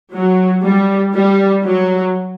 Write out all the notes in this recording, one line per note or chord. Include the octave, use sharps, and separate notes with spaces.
F#3
G3
G3
F#3